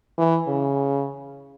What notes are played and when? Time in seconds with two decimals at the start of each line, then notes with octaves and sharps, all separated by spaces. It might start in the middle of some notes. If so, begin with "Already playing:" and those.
0.18 E3
0.48 C#3